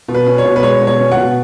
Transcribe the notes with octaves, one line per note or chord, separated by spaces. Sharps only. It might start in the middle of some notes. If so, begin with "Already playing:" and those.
B2
B4
C#4
C#5
B2
B4
G#3 C#5
B2
C#5
C#4
F#5
B2